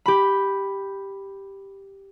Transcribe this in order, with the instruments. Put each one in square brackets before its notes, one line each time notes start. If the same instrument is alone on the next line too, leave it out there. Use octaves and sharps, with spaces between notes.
[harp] G4 B5